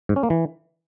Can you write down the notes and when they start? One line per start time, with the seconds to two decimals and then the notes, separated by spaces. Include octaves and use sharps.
0.09 G#2
0.16 C#4
0.23 A#3
0.30 E3